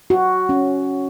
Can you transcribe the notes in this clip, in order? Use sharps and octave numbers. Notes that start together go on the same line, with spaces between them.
F#4
C#4